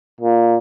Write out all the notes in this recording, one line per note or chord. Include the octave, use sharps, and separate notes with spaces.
A#2